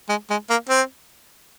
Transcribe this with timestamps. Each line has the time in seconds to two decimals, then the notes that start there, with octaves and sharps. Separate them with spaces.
0.09 G#3
0.30 G#3
0.50 A#3
0.69 C4